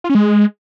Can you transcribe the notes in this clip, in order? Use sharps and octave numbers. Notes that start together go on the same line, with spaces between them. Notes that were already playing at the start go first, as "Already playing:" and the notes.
F4
C#4
G#3